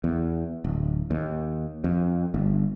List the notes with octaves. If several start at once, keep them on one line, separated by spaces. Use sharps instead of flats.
E2
D1
D#2
F2
G1